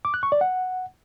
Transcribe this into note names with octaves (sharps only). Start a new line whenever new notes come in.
D6
F#6
C#6
D5
F#5